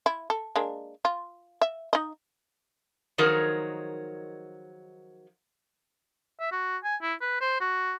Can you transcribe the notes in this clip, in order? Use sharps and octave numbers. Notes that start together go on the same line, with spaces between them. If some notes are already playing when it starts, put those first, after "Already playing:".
E4
A4
G#3 A#3 D4
F4
E5
D#4 D#5
D#3 F3 F#3 D#4 G#4 A#4
E5
F#4
G#5
E4
B4
C5
F#4